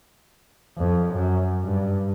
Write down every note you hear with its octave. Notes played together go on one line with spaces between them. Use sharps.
F2
F#2
G2